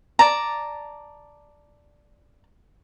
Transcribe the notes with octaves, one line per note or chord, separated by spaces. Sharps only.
D5 A5 A#5